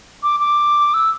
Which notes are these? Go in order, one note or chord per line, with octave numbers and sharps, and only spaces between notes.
D6
D6
E6